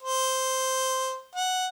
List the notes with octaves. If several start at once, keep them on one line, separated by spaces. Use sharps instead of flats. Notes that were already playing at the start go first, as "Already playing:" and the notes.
C5
F#5